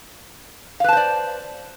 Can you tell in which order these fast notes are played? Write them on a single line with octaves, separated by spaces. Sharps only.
F5 B4 A5 C5 D5